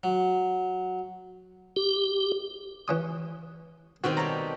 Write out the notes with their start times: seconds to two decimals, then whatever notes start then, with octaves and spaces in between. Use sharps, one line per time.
0.03 F#3
1.76 G4
2.88 E3 C#4 D#6
4.04 B2 D#3 C4 F#4
4.17 G3 A4 C#5 A#5